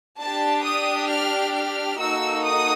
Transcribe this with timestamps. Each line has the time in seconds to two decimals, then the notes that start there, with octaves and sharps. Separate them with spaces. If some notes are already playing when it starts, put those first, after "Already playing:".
0.19 D4 G4 A5
0.64 D#6
1.09 F6
1.54 F6
1.98 A#3 D#4 F#4 A4 E6
2.43 D#6